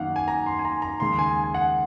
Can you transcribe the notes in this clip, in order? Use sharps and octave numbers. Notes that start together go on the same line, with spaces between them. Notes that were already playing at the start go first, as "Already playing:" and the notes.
Already playing: F#2 D#3 A#3 F5 F#5
G#5
A#5
C6
G#5
A#5
A#5
D#2 C#3 G#3 C6
G#5
G#5
F#5